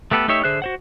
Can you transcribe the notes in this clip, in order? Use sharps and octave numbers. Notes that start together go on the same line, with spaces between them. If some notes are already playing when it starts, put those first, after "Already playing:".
A3 B3 G4 A4 B4
A3 D#4 G4 C#5 E5
D3 G#4 C5 E5 F#6
F#4 C5 F#5